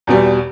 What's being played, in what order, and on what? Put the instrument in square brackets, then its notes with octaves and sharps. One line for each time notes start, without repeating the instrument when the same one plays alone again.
[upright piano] E2 B2 G3